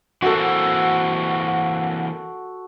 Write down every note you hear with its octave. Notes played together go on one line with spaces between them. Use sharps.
E3 A#3 C4 F#4 A4 F#5